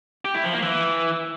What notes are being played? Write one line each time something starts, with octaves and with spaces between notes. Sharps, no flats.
G4
E4
F3
A#3
E3